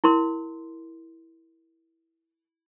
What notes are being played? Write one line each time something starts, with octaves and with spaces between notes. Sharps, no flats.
E4 A#4 C6